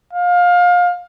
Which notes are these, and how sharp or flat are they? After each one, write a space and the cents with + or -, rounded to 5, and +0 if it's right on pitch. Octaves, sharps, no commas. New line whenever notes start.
F5 +25